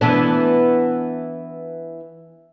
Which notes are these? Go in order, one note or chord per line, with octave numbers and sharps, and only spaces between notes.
E3 B3 D4